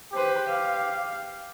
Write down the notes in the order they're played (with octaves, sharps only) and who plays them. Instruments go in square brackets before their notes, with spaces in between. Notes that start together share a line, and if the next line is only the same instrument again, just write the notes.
[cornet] G4 [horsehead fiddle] B4 C5
[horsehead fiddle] F5